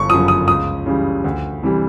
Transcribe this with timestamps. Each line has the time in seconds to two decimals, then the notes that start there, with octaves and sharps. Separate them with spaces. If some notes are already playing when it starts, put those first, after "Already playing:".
Already playing: G1 C#6
0.10 F#2 C#3 F3 D#6
0.28 D#6
0.47 C#2 D#6
0.86 C#3 E3 G3
1.24 D2
1.63 C3 E3 G3